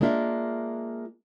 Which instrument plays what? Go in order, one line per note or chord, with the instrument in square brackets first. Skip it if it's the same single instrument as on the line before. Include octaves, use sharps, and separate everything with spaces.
[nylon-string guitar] G#3 A#3 D4 F4 E5